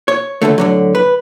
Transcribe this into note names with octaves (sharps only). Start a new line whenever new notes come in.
C#5
C#2 F#2 D3 A3
A2 D3 F#3
B4